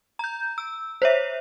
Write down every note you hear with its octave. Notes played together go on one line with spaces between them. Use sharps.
A#5 G6
E6
C5 C#5 E5